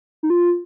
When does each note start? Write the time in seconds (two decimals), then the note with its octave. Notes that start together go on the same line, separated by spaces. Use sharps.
0.23 D#4
0.30 F4